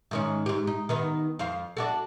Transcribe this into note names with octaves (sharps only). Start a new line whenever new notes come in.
G#2 D#3 C#4
G#2 G4
D#4
D#3 B3 D#4
F2 C5 F5
D4 F#4 A4